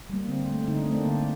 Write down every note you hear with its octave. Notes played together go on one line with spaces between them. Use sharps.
G3 A#3
D3 C4
A3
D3 D#4
D4
A3 C4
A#3 D4
D3